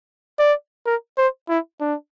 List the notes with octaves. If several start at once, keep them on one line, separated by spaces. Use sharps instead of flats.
D5
A#4
C5
E4
D4